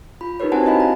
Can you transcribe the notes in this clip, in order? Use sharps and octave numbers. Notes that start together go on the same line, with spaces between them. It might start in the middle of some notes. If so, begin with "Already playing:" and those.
F4 B5
D4 D#4 G4 A#4 B4 C#5
C4 F#4 C5 F#5 G#5 A5
E4 F#4 D#5 F5 B5
A#5